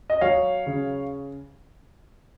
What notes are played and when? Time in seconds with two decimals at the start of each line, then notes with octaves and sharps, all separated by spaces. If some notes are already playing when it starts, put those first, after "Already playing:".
0.10 D#5
0.21 F#3 C#5 F5
0.66 C#3